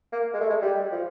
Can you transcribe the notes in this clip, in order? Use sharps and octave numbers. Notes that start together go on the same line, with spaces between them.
A#3
G#3
A3
G#3
G3
F3